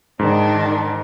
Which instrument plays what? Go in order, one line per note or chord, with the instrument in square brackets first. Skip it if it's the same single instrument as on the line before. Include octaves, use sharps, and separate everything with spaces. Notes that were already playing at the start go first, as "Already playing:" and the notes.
[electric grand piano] G#2 [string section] D#3 D4